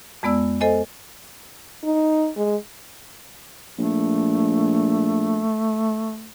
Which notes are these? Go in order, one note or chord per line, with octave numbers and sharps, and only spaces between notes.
F2 G#3 B3 D5 E6
A4 C5 D#5 G#5
D#4
G#3
A#1 A3